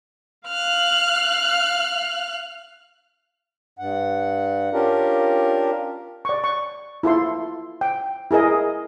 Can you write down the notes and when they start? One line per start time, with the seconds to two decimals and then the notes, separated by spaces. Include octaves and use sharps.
0.48 F5 F6 F#6
3.79 G2 F#5
4.73 C#4 D4 F4 G4 A#4
6.25 D5 C#6
6.44 C#6
7.03 E4 F4 A4 C6
7.81 G5
8.31 E4 G#4 A#4 D#5